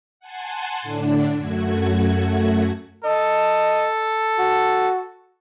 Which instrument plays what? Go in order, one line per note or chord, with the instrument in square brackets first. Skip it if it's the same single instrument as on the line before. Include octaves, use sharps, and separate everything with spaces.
[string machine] F#5 G#5 A5 C6
A2 D3 D4
F#2 A3 F#4 G#6
[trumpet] A4 [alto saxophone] D#5
[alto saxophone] F#4